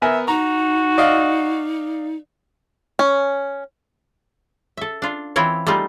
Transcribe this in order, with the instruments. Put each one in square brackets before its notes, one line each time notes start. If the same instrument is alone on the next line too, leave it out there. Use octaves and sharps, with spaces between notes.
[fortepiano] B3 A#4 G#5 [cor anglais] E5
[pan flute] D#4 [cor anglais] F#4 [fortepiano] A#5
[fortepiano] D5 D#5 F5
[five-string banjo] C#4
[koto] A4 E5
D4 F4
E3 C4 E4 F4 C#5
G3 A3 A#3 D#4 F4